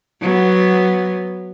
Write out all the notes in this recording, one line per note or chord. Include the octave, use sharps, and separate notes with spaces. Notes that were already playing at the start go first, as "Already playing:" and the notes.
F#3 B3